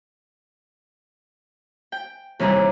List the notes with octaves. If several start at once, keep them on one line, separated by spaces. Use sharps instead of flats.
G5
D#2 C3 E3 G3 G#4 A#5